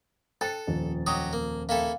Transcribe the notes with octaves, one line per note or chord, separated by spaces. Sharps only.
A4 C5 G5 A5 A6
D#1 F2
F#3 G4 D#5 D#6
A#3
A#3 E4 A4 F5 G5